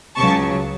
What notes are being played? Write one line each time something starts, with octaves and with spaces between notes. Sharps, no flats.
C#2 C#3 F#3 A5 C#6